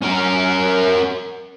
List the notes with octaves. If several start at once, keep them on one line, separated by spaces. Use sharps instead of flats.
C#4 A#4